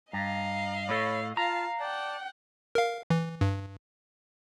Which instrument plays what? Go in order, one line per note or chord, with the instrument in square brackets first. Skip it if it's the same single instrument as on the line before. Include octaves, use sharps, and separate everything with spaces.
[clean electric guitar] G2 [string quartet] D#5 F5 [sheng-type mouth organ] A#5
[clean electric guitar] A2 A4 [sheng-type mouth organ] C#5 B5
[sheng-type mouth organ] F4 A5 [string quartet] F5 [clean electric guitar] A#5
[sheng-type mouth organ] D5 A5 [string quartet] F#5 G5
[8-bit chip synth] A#4 F5
E3
G2